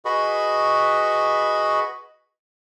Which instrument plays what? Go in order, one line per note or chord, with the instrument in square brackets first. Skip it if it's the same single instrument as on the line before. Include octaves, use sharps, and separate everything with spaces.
[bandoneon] F#4 G#4 B4 D#5 B5 C#6